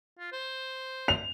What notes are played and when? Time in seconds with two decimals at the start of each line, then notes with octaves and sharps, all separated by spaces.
0.19 F4
0.32 C5
1.08 F7